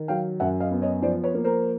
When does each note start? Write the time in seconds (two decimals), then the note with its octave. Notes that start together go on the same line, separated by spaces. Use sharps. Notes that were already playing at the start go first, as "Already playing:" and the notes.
Already playing: D#3
0.08 F#3 F5 G5
0.40 F#2 E5 F#5
0.60 D#5 F5
0.71 B3
0.82 C#5 D#5
1.02 F3 C5 D5
1.24 B4 C#5
1.34 A#3
1.44 A#4 C5